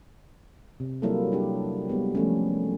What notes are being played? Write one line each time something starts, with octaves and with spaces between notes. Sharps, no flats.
C3
F#3 G3 A#3 E4 F4 A4
G3 D4 G4
G3 G#3 B3 G#4
F3 A3 C#4